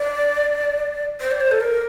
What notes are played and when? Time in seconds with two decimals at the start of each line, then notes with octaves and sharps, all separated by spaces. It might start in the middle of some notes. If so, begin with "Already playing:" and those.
Already playing: D5
1.21 C5
1.31 D5
1.41 C5
1.51 A4
1.61 A#4